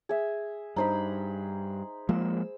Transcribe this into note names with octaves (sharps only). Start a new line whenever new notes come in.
G#4 E5
G2 D#4 C5 B5
F3 G#3 A#3 E6